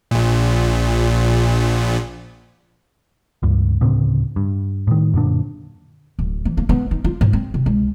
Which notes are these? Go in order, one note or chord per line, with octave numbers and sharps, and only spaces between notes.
A#1 A#2
C#2 G2
D2 A2 C#3 C4
G2
A2 D#3
F#2 A#2 D3 D4
D1
E3
A#3
B3
D#4
F4
G#2
C4
C3
C#2